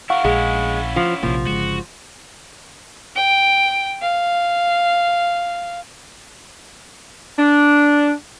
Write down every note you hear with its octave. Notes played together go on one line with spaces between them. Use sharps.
E4 A#4 F5 F#5 C#6
A#1 G#3 C#4 E4
F3
A#1 C3 F3 A#3
G1 C#3 G#3 F#4
G5
F5
D4